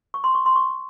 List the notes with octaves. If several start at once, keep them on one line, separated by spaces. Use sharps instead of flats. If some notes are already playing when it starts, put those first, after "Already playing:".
C#6
C6
C#6
C6
C#6